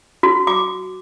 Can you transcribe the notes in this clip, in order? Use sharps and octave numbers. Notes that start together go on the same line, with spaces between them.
F#4
D6